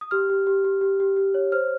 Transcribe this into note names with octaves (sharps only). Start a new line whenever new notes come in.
D#6
G4 F6
G4
G4
G4
G4
G4
G4
C#5
C5 F6